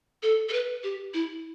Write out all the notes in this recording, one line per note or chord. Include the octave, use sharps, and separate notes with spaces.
A4
A4
B4
G4
E4